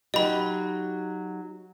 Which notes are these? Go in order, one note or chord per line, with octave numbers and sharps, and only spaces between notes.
F#3 D#4 G4 D#5 B5